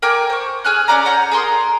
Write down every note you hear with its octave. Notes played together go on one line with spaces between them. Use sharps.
A#4 G5 G#5 D6
C5 C#6
G#4 G#5 F6 F#6
C#4 D#4 D5 A#5
C#5 F#5 A#5 G6
G#4 A#4 C6 D#6